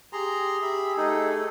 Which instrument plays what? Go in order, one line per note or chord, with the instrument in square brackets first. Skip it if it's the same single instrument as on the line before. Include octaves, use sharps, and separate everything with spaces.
[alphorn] G4 [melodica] G#4 [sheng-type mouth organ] A#5 C6
[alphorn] G4 [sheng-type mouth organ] E5 B5
[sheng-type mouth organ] A3 G#4 A4 [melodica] D#4